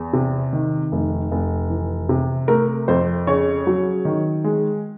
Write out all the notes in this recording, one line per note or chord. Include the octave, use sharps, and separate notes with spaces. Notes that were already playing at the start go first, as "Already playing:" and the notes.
Already playing: E2
C3
D#3
F1
F1
E3
C3
A3 A#4
F2 C5
C#3 C#5
F#3
D#3
G#3